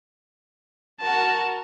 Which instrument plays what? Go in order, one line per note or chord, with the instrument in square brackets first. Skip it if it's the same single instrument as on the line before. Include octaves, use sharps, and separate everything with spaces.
[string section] F#4 A#4 [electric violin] A5